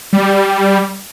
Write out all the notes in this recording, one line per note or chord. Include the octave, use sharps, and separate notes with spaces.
G3